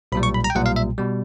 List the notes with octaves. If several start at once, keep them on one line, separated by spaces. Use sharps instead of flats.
B1 A#2 G3 B5
C#6
B5
A#5
G5
B1 A#2 G3 F#5
F5
E5
B2 G3